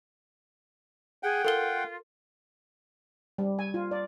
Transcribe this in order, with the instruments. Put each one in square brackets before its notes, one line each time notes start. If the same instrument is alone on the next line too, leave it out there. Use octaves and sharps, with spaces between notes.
[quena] G#4 [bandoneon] F#5 G5
[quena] F4 [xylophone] A4 A#4 G7
[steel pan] G3
G#5
F4
D5